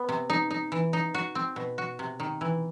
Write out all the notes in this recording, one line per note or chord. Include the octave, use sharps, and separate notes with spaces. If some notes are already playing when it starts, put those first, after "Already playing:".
Already playing: B3
C3
D#4
D#4
E3
D#4
F#4
C4
B2
F#4
C3
D#3
E3